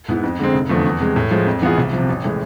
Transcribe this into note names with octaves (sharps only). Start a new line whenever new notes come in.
G#2 G#3 B3 E4
F2
D3 G#3 C4
F1
E2 D3 F3 A3
E2
C3 G#3
A2
F3 G#3
F2
E3 B3 F4 G#4
C2
F3
C3
A1
A2 E3 G#3